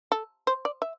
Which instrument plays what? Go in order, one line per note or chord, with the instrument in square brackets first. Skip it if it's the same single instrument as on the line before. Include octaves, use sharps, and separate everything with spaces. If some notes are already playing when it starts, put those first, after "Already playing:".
[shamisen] A4
C5
D5
E5